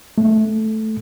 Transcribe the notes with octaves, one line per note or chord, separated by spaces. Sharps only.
A3